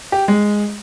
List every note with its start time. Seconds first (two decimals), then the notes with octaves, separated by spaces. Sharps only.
0.12 G4
0.28 G#3